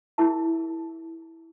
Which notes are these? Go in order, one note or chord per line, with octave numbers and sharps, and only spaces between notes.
E4 G#4 A#4 E5 A5